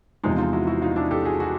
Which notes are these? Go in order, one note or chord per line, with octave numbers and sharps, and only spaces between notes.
E2 C3 F3 G#3 D#4
D#4 F4
E4 F#4
E4 F#4
D#4 F4
D4 E4
G4 A4
F#4 G#4
F#4 G#4